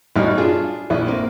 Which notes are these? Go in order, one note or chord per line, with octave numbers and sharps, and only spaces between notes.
A1 B2 E3 G3 D#4 F6
D4 F4 G#4
A#1 E4
A#3 C4